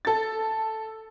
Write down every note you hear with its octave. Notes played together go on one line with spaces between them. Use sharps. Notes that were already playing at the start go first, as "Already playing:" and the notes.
A4 A6